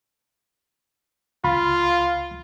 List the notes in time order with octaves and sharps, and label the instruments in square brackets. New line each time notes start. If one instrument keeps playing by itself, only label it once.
[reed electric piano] C#2 B5 [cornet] F4